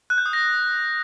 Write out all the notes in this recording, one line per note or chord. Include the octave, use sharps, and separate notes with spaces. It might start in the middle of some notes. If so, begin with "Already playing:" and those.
F#6
G6
D#6
A#6